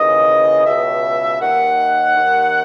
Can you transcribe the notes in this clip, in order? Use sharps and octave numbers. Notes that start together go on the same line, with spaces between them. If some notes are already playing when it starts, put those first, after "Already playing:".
Already playing: D#2 C#3 E3 D#5
C#2 B2 E5
D#2 D#3 F#5
D#2 D#3